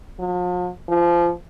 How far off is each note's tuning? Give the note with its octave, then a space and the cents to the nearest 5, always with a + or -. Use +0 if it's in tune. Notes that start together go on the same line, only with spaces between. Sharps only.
F3 +45
F3 -20